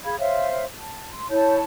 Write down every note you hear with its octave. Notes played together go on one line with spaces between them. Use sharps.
G#4 F5 B5 G#6
C5 C#5 E5 F5
A5
C6
E4 C#5 A5 G6